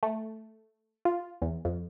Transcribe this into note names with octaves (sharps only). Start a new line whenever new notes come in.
A3
F4
E2
F2